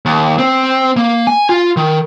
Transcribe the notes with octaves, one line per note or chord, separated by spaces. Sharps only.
D#2
C4
A#3
G#5
F4
D#3